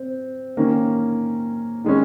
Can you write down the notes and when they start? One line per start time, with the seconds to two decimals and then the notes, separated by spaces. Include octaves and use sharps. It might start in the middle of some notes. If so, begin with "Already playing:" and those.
Already playing: C4
0.57 D#3 A#3 C#4
1.84 D#3 G#3 C#4